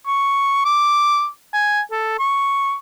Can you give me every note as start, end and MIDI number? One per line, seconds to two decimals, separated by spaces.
0.07 0.60 85
0.65 1.28 86
1.53 1.81 80
1.92 2.19 69
2.19 2.74 85